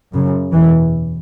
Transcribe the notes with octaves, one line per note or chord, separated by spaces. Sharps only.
F#2 C#3
E2 B2 E3